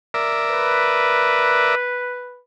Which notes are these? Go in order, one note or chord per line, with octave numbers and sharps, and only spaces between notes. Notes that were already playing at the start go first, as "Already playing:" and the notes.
A#4 D5 E5
B4